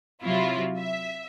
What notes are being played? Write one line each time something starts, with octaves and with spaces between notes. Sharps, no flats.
C3 F#3 E4 F4
E5